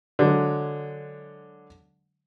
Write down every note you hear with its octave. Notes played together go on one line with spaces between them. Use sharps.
D3 F#3 G#3